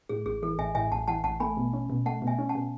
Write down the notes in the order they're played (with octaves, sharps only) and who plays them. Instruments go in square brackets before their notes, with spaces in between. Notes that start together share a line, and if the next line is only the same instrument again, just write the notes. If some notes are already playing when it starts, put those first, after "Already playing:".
[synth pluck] A2 [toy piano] G#4
[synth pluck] A1 [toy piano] G#4
[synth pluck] E3 [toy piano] A4
[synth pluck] A1 [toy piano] E5 G#5
[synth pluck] A2 [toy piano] E5 G#5
[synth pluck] A1 [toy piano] F#5 A5
[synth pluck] E3 [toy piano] F#5 A5
[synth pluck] A1 [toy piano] F#5 A5
[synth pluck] A3 [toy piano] G#5 B5
[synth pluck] B2
C#4
B2
[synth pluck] A3 [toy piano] F#5 A5
[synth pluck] B2
[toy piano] E5 G#5
[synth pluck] C#4
[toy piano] F#5 A5
[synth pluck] B2